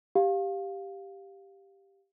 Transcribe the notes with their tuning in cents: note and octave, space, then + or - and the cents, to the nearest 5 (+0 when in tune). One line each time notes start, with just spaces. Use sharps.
G4 +0 F5 +10